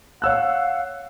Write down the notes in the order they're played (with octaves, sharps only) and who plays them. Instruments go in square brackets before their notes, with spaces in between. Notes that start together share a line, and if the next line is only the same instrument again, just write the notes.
[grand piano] C#5 E6 F#6 [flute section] F5 F#5